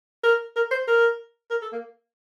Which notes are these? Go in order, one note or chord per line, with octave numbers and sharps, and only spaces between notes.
A#4
A#4
C5
A#4
A#4
A4
A#3